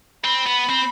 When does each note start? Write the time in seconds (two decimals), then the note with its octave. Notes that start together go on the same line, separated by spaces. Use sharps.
0.24 C4 B5
0.46 B3
0.70 C4